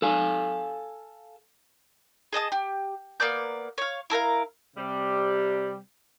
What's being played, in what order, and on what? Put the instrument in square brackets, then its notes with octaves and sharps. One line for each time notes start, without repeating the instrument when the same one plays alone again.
[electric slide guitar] A4 F5 G#5
[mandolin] G#4 D#5 A5 D#6
G4
A#3 B3 D5 G6
C#5 F5
E4 A4 A#4 F5
[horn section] C3 G3